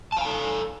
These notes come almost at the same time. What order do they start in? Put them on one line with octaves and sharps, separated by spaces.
A5 F5 G#5 A4